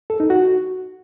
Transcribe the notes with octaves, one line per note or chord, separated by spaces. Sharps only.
A4
D#4
F#4